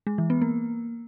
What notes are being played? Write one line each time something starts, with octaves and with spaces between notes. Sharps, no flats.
G#3
E3
B3
A#3